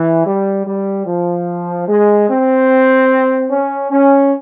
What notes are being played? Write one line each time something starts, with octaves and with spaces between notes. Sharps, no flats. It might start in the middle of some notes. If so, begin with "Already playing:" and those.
Already playing: E3
G3
G3
F3
G#3
C4
C#4
C#4